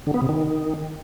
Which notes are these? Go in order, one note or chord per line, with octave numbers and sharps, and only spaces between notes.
D3
B3
C3
D#3